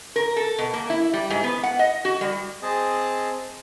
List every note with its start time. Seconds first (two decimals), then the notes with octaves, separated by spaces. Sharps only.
0.16 A#4
0.36 A4
0.58 B2
0.73 A#3
0.90 E4
1.13 G3
1.30 G#2
1.43 B3
1.63 F#5
1.79 D#5
2.05 F#4
2.21 G3
2.62 C4 G#4 D#5 A5